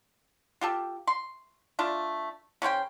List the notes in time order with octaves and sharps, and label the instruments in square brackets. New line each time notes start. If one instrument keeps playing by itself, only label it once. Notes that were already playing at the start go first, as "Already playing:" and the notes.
[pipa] F4 G4 A4
C6
A3 D4 F4
C#3 C#4 C5 G5